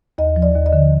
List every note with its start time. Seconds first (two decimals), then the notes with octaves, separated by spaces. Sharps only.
0.18 D#2 D#5
0.36 F3
0.42 D5
0.55 D#2
0.66 D#5
0.73 D3